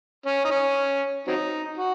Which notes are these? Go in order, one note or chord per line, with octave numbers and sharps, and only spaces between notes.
C#4
D#4
C#4
F#3 C4 D#4
F#4